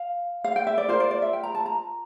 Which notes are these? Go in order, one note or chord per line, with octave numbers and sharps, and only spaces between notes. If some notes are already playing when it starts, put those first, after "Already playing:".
Already playing: F5
F5
G5
E5
D5
F4 A#4 C5
D5
D5
E5
G5
A#5
A5
A#5